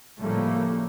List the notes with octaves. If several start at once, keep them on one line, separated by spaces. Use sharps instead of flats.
A2 C#3 F3 G3 A3 A#3